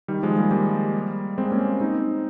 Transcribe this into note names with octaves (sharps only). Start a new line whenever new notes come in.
D#3 G3
F3 G#3
G3 A#3
G3 A#3
G#3 C4
A#3 C#4
C4 D#4